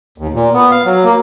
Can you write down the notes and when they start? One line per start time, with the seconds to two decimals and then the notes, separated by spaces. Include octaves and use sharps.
0.18 D#2
0.34 A#2
0.54 B3
0.71 F5
0.86 F#3
1.04 A#3